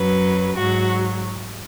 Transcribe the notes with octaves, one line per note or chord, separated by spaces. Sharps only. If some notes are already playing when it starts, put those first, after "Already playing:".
Already playing: F#2 F#3 B4
G#2 F#3 F#4